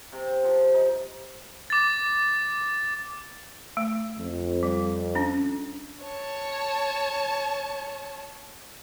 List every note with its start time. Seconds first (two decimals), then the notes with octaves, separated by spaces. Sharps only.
0.12 C3
0.44 F3
0.74 D#4
1.70 D6 A6
3.77 A3
4.18 F2
4.63 G3
5.15 C#4 D4
6.03 C#5 A5